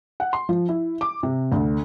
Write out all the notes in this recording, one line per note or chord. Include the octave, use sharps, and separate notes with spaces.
F#5
C6
F3
E4
D6
C3
D2